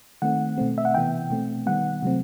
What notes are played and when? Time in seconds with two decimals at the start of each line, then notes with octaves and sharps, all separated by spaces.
0.22 D#3 A3 C4 F#5
0.58 B2 A3 C4
0.78 E5
0.85 F#5
0.94 C3 E3 B3 G5
1.30 B2 A3 C4
1.66 D#3 G3 B3 F#5
2.03 C3 F#3 A3 C4